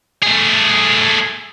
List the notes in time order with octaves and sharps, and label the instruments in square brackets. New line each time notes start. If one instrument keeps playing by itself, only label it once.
[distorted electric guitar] A3 G#4